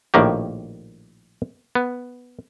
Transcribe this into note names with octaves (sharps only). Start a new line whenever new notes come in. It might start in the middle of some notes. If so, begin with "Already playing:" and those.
A#1 A2 D#3 A#3 G4
B3